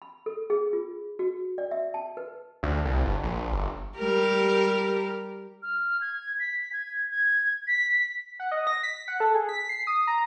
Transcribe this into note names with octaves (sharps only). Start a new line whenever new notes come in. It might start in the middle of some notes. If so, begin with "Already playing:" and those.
B5
A4
G#4
F4
F#4
D5
E5
A5
B4
D2
C2
G1
A#1
G1
G3 G4 A#4
F6
G#6
B6
G#6
G#6
B6
F#5
D#5
A#6
B6
F#5
A4
G#4
B6
C7
D#6
A#5